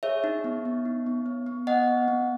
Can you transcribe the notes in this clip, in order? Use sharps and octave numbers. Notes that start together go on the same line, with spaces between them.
G#4 C#5 E5
D#4
B3
B3
D#4
B3
B3
B3
B3 D#5 F#5
B3
B3